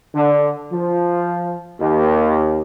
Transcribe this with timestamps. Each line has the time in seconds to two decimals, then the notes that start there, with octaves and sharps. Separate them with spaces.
0.14 D3
0.71 F3
1.79 D#2